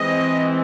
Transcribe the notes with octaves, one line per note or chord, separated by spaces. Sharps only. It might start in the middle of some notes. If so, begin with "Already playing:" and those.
Already playing: E3 G#3 C4 D#5